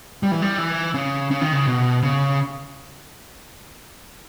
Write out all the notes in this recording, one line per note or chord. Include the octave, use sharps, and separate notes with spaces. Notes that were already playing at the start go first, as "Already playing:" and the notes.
G3
E3
G3
E3
C#3
C#3
D#3
C#3
B2
C#3